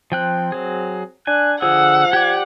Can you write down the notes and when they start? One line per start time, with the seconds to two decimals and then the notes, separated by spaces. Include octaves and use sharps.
0.12 F3 C4 G5 F#6
0.52 F#3 G#4
1.27 D4 G#5 F#6
1.62 D3 F3 G#4 F#5 E6
2.13 G4 D5 G#6